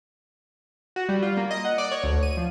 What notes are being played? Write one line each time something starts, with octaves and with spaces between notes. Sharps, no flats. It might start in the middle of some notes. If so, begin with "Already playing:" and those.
F#4
G3
F4
A#3
D#5
F#5
D5
C#5
D2
D#7
F3